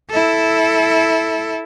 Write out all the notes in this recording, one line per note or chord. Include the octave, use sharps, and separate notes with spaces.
E4 A4